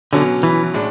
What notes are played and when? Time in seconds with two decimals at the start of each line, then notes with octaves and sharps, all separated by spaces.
0.13 B2 D3 F#3 C#4
0.43 E3
0.74 A2 G#3 D4